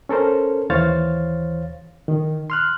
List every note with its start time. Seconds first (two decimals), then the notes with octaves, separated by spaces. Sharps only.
0.09 C#4 A4 A#4 C5
0.70 D#2 E3 C5 C#5 F5 A6
2.08 D#3
2.50 C6 F6 F#6